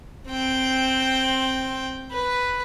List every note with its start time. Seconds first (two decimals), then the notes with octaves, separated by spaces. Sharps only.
0.29 C4 G5
2.12 B4